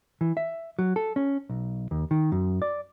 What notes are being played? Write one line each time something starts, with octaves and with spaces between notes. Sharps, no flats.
E3
E5
F#3
A4
C#4
B1
D#2
D#3
F#2
D5